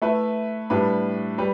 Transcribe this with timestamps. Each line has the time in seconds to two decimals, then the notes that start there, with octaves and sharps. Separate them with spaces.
0.02 A3 E4 B4
0.70 A2 G3 D4 B4
1.38 G3 B4